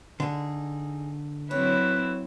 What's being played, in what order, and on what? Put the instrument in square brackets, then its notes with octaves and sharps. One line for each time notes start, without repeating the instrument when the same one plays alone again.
[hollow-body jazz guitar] D3 [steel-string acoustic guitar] D#4 G#4
[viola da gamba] F#3 C4 E4 [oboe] B4 [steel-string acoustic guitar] C#5